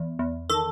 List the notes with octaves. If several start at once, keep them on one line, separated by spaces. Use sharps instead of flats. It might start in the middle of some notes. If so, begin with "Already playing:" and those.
Already playing: E2
E2
D#3 A4